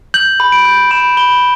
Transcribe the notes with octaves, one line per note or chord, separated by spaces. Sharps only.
G6 F#7
B5
D7
G6
B5 E7
B5 G7